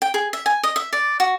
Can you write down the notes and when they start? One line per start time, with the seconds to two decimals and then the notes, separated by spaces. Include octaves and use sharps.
0.02 G5
0.14 G#4
0.33 E5
0.46 G#5
0.63 D#5
0.76 E5
0.93 D5
1.20 F#4